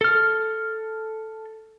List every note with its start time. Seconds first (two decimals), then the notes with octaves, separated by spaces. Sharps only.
0.01 A4 F6